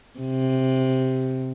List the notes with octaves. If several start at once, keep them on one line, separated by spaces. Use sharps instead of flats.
C3